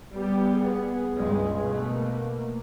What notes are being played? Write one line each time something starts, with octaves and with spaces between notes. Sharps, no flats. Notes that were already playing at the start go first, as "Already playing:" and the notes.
G3 B3 G4
B3 G#4
C#2 G2 G#3
B2 A3
A#3